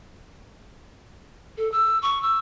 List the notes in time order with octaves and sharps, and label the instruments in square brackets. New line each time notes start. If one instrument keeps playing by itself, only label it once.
[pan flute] A4
E6
C#6
E6